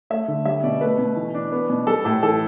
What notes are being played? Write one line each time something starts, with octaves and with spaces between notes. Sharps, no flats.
A3 E5
D3
G3 E5
B2 D5
A3 B4
B2
E3
D4
B3
B2
G3 A4
A2 A4
E3 A4